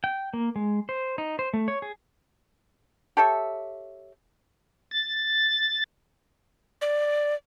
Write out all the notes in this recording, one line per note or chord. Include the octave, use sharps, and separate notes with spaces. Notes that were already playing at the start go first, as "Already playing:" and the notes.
G5
A#3
G#3
C5
D#4
C5
A3
C#5
G#4
G4 A4 C#5 E5
A6
D5